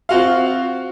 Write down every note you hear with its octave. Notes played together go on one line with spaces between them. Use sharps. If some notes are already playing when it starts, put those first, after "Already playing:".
C4 F4 F#4 F5